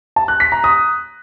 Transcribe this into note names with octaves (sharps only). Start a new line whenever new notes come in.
A5
F#6
B6
A#5
D#6